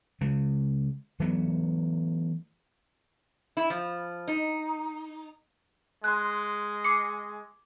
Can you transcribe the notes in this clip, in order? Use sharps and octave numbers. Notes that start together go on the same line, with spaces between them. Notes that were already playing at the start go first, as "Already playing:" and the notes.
C#3 G#3
E3 F#3 A3 B3
E4
F3
D#4
G#3 C6 F#6
D6 C7 C#7